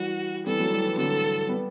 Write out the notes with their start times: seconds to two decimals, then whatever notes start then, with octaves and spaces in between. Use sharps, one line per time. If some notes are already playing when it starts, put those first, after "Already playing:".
Already playing: E3 G3 F#4
0.47 E3 G3 A4
0.60 F#3 A3
0.72 E3 G3
0.86 E3
0.97 D3 F#3 A4
1.48 G3 B3